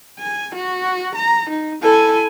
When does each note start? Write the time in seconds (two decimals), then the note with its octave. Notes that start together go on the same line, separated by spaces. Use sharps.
0.19 G#5
0.55 F#4
1.15 A#5
1.49 D#4
1.82 E4 A4 G#5